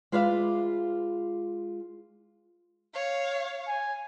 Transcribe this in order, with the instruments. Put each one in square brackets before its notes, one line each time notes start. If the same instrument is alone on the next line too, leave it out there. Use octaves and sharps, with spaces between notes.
[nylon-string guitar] G#3 F4 B4 D5 E5 F5
[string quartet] C#5 F5
[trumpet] G#5